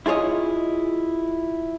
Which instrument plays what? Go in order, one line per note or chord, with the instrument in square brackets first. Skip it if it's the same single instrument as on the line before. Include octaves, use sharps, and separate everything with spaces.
[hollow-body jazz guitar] E4 F4 G#4 C#5 D#5